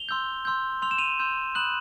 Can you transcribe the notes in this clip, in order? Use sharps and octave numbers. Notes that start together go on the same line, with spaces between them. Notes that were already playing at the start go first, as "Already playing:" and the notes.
Already playing: F7 G7
C6 E6 G6
C6 E6 G6
C6 E6 G6 F7
E7
D#7 F7
C6 E6 G6
B5 D#6 F#6 E7 F#7